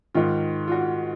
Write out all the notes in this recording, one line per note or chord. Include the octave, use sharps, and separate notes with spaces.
G#2 D#3 F4
F4
F#4